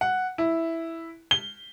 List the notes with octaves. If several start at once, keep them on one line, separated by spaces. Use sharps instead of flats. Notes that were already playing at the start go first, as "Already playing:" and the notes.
F#5
E4
G7